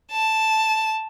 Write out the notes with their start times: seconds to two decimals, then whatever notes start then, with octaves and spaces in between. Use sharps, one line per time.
0.12 A5